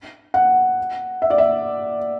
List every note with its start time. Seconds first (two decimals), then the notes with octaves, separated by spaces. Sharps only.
0.34 F#5
1.22 E5
1.30 D5
1.38 E5